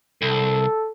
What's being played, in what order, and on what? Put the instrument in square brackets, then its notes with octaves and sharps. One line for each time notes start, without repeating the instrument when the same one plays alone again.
[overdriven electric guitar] C2 [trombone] A4